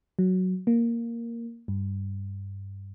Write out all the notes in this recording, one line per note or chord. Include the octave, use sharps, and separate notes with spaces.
F#3
A#3
G2